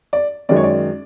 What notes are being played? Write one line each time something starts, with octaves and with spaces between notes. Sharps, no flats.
D5
F#2 D#3 G#3 D5
C#5
D5